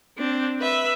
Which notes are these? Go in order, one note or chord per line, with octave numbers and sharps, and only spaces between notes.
C4 D4
B4 E5